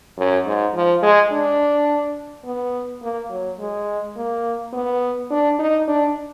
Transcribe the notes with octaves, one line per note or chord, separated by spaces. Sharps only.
F#2
G#2
F3
G#3
D4
B3
A#3
F#3
G#3
A#3
B3
D4
D#4
D4